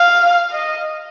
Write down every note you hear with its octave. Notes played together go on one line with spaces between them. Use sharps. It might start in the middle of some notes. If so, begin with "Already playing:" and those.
Already playing: F5
D#5